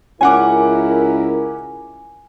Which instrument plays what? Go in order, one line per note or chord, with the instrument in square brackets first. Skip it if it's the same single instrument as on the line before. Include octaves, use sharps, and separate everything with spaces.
[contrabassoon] C#2 [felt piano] C#4 F#5 D6 [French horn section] E4 A#4 [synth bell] G#5